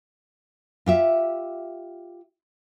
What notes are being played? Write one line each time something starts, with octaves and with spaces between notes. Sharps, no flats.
F4 G4 E5